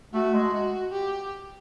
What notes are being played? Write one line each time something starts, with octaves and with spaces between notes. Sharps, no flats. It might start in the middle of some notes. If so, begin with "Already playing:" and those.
A3 F#4
G#3
F#4
G4